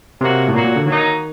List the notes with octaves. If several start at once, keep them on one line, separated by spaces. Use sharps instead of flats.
C3 F#3 A#3 F#4
A2
A#2 F#3 A#3 F#4
A#2
D3
D#3 F#3 A#3 D#4